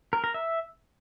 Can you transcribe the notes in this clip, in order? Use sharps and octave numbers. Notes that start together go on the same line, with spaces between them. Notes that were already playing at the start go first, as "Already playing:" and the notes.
A#4
A#4
E5